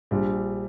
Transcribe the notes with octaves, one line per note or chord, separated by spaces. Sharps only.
A#1 G3